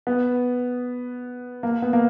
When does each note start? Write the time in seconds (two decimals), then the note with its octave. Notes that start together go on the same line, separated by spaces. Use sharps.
0.07 B3
1.63 A#3
1.82 B3
1.93 A#3